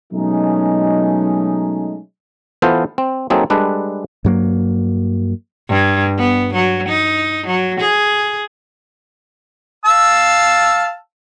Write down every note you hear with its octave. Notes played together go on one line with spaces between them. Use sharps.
B2 F#3 G#3 A3 C#4 D#4
E3 B3 F4 A4 C5
C4
F#3 A#3 C4 D#4 G#4 A4
G3 G#3 D4 A4 B4
G2 F#3 A#3
G2
B3
F#3
D#4
F#3
G#4
F5 A5 E6